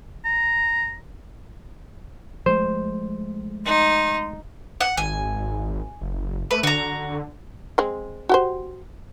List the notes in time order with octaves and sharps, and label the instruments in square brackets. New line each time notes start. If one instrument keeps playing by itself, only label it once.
[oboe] A#5
[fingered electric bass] F3 G#3 A3 [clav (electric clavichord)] C5
[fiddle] D#4 [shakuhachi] C6
[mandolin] F#5
[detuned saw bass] G#1 [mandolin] G#5
[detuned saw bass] F#1
[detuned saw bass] A3 [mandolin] B4
[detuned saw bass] D3 [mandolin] F#4 A#5
[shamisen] G#3 C4
F#4 G4 C5